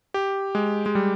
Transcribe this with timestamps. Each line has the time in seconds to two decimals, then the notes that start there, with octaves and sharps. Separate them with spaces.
0.14 G4
0.55 G#3
0.86 G#3
0.95 G3